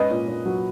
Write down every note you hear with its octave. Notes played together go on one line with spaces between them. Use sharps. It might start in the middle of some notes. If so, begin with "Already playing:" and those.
Already playing: G#2 C#4 B4 D#5
A#2
A#2
F#3